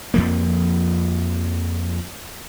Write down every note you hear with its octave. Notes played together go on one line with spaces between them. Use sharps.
F2 F3 A#3